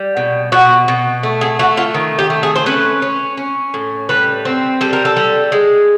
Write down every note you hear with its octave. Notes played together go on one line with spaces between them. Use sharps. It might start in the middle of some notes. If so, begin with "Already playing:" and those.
Already playing: G3
B2
B2 F#4
B2
A3
G#4
A3 F#4
F4
D#3
G4
A3
G#4
C5
C#4 B4
C#4
C#4
A2
G3 B4
C4
G3 A4
A#4
A4
G3
G#3